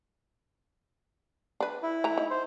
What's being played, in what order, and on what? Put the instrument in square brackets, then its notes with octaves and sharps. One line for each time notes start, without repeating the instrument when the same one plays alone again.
[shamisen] D4 B4
[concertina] E4
[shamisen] E3 A3 A#5
D#4
[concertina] C5